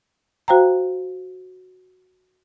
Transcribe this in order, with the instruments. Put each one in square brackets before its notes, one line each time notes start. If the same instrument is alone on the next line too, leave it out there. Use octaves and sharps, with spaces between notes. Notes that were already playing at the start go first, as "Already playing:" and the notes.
[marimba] F#4 C5 F5 G5 A#5